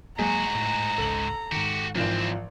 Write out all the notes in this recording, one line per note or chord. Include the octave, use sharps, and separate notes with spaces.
G#2 F#3 G#3 A#3 F#4 G#4 A#5
A2
G#1 C#2 A4 F#7
G#2 D#3 F#4 G4
G#1 D#2 E3 F3 C4